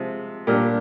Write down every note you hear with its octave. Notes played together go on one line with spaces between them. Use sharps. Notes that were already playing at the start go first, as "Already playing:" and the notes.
Already playing: C3 F3 G#3
A#2 G3 D4 G4 A#4